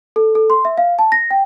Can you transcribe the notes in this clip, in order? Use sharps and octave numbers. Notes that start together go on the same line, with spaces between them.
A4
A4
C6
E5
F5
A5
A#6
G5